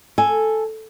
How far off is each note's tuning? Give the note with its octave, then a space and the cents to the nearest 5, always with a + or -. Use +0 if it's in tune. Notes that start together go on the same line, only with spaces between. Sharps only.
A4 +0 G#5 +0